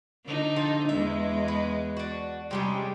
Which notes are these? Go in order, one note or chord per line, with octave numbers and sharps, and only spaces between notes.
D3 D#4
F3 F4 A4
E2 G#3 E5
B4
D4 F#4
C3 G3 G#3 C#4